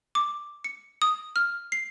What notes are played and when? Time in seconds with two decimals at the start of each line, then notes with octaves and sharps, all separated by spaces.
0.15 D6
0.64 C#7
1.02 D#6
1.36 F6
1.72 C7